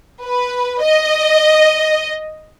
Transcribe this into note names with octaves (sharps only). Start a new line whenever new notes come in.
B4
D#5